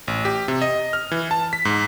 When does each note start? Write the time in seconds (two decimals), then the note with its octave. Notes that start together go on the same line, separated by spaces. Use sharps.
0.08 A1
0.25 G4
0.48 C3
0.62 D#5
0.93 F6
1.11 E3
1.31 A5
1.53 B6
1.65 G#2